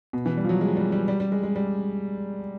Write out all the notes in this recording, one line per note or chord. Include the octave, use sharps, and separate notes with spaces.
B2
E3
G3
F3
F#3
G#3
G3
G3
G3
G3
G#3
G#3
G3